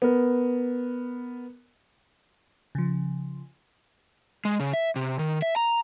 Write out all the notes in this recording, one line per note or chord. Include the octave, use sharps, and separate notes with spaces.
B3 A#4
C#3 F3
G#3
C#3
E5
C3
D#3
E5
A#5